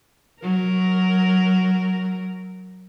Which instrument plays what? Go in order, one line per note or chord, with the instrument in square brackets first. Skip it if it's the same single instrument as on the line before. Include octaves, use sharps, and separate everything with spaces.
[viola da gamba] F#3 A#4